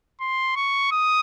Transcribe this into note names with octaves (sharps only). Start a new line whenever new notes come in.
C6
C#6
D#6